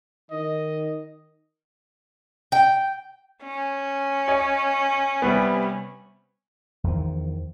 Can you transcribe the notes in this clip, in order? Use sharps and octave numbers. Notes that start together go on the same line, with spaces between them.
D#3 D#5
G5
C#4
C#5 D#5 G#5
C3 G3 B3
E2 D#3 F3